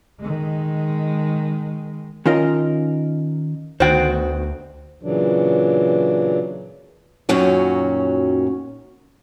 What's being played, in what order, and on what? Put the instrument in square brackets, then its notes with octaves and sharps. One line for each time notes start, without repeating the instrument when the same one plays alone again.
[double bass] D#3 G#3
[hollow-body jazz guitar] D#3 C#4 F4 A#4 D#5
[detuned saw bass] D2 [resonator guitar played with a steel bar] D#3 B3 F#4 [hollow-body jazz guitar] C5 G5
[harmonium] A#2 C#3 E3 F#3 D4
[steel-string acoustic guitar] F#2 A#2 D#3 F#3 C#4 F#4